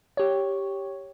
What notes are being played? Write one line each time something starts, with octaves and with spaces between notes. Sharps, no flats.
G4 C#5